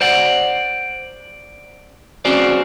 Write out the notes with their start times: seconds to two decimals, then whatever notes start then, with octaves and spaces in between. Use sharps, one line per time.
0.01 C5 D5 F#5
2.25 C4 C#4 F#4 G#4 C5 D5